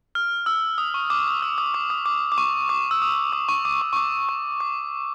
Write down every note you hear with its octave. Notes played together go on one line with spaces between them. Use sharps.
F6
E6
D#6
C#6
D6
D#6
E6
D#6
D6
D#6
D6
D6
C#6
D6
E6
D#6
D6
C#6
D6
C#6
C#6
D6
C#6
D6